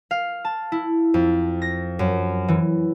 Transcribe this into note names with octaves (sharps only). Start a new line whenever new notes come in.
F5
A5
E4
F2
A#6
F#2
E3